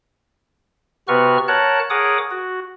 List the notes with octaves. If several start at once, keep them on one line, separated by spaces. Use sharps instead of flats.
C3 B3 F#4 B4 C#6 F6
A#4 C#5 F#5 A5 F#6
G#4 A#4 C#5 F#5 D6 D#6
F#4